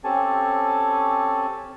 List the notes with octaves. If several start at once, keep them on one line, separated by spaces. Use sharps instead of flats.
C4 C#4 G4 A4 G#5 A5